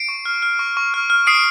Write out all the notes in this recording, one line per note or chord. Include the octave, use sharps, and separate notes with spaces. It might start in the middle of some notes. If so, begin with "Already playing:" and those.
Already playing: C7 D7
C#6
F6
F6
C#6
C#6
F6
F6
D#6 C7 D7